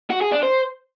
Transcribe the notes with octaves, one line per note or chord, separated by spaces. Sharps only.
F#4
G#4
D4
C5